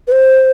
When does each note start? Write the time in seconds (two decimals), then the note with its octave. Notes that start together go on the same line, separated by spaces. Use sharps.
0.08 B4
0.12 C5